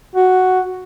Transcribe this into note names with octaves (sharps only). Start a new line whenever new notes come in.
F#4